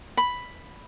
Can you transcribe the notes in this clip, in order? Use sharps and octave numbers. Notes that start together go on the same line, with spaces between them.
B5